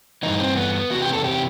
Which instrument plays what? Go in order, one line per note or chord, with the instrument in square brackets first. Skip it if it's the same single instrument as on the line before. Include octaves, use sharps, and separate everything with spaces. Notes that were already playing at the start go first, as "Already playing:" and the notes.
[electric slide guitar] G2 E3 D#4
C4
B3
E2 C3 E3 F#4
G4
A4
G4